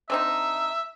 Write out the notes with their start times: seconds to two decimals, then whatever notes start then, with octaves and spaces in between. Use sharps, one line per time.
0.10 D3 C4 D#4 E5